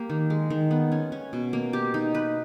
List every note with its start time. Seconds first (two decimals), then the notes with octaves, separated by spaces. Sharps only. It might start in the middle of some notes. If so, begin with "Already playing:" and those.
Already playing: A#3 G4
0.10 D#3
0.30 G#3
0.50 D#3
0.71 B3
0.92 C#4
1.12 C#4
1.33 B2
1.53 A#3
1.73 G4
1.94 D#4
2.15 B4